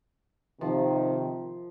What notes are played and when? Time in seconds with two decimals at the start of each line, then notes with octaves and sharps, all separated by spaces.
0.61 C3 D#3 F3